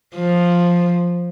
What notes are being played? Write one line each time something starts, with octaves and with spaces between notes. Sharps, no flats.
F3